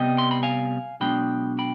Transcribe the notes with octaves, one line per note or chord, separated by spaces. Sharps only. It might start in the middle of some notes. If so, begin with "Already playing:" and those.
Already playing: C2 C3 G3 B3 D#5 G5
C6
B5
F5 G#5
B1 B2 G#3 D4 G5 B5
G5 B5